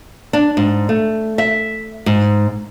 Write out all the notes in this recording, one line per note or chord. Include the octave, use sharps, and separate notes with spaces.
D4
G#2
A3
E5
G#2